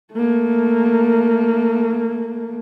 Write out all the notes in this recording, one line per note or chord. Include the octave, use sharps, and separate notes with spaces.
A3 A#3